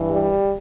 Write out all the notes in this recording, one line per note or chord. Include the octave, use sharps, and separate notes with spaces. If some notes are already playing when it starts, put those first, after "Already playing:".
Already playing: G2 E3
G3